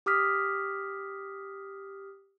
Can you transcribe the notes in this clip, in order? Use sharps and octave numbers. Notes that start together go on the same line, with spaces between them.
G4 D6 D#6 F6 B6